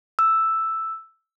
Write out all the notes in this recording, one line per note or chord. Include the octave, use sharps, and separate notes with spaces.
E6